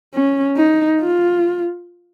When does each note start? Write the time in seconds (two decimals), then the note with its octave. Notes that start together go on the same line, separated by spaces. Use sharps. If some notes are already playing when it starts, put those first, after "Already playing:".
0.14 C#4
0.57 D#4
1.01 F4